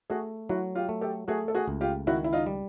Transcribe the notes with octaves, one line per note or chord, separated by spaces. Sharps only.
A3 F#4 G#4
F#3 E4 F#4
F4 G4
A3
G4 A4
A3 F#4 G#4
A4
F#4 G#4
C#2
F4 G4
D#3 E4 F#4
E4
D#4 F4
G3